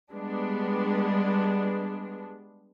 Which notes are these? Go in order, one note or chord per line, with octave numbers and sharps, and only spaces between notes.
G3 G#3 B3 D4